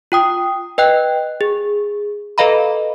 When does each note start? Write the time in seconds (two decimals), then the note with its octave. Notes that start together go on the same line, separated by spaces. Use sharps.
0.12 F4 G5 D#6
0.78 B4 D#5 G5 F#6
1.41 G#4
2.38 A4 B4 D#5 F5 A#5 B5